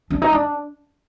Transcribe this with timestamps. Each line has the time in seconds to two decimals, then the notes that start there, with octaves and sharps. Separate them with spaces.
0.10 D4
0.22 D#4
0.32 D4